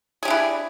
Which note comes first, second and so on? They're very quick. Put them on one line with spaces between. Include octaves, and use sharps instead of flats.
G#4 G4 D4 E4